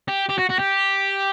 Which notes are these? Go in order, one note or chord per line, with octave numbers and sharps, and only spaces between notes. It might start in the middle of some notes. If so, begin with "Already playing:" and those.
G4
G4
F#4
F#4
G4